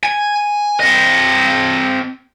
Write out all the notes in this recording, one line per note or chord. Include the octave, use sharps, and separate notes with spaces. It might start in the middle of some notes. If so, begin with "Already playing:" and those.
G#5
C4 D#5